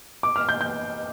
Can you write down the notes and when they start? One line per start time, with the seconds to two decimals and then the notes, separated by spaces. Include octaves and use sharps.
0.23 D6
0.36 F6
0.49 G6
0.61 G6